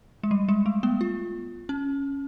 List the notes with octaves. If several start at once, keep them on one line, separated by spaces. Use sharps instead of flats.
G#3
G3
G#3
A3
B3
F4
C#4